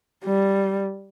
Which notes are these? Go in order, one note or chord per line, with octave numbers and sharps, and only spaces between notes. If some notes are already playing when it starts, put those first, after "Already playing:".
G3